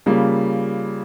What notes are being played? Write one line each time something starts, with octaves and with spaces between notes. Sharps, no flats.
C#3 G3 A#3 F4